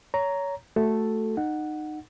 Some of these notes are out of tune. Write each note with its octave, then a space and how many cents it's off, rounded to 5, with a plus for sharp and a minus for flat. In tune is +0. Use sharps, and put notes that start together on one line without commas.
C#5 +20 A#5 +0
A3 +0 F#4 +0 A4 +0
D#4 -25 F#5 +0